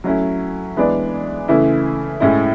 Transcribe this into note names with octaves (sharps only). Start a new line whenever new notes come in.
F#3 A3 C#4 E4
E3 G#3 B3 D4
C#3 E3 A3 E4
A2 G#3 C#4 E4